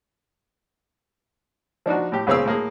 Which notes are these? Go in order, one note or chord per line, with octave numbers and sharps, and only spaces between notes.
F3 D4 D#4 F#4
A2 G4
C#2 C#3 C4 G#4 F5 E6
A2 A#3 G#4